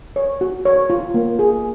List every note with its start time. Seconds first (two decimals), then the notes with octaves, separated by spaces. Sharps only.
0.16 C#5
0.41 F#4
0.65 C#5
0.90 F4
1.14 A#3
1.39 G#4